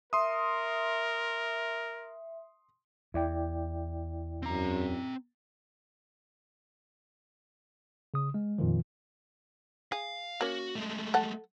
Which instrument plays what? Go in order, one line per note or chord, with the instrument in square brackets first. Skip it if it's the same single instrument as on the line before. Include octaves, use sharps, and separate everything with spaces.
[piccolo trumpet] A#4 [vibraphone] E5 [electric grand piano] C6 D#6
[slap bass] E2 [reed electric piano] E4 D5 G5
[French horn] F#2 [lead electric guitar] C4 A#5
[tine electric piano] C#3 D#6
G#3
F2 A#2 D#3 F3
[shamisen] G#4 [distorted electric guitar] F5
[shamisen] A#3 C#4 [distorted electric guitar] F#4
[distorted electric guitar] G#3 A3
[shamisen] A4 F#5